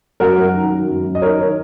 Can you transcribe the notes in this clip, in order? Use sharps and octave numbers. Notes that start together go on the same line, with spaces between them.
F#2 F#4 A#4
F#2
D#3
F#2
F#2
F#2
D#5
D#3 A#4 C#5
D#3